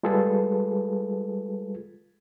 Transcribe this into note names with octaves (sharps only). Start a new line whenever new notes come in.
G3 G#3 F4 G#4 A4 B4